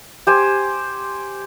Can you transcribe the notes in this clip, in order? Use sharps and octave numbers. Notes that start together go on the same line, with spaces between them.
G4 C5 G#5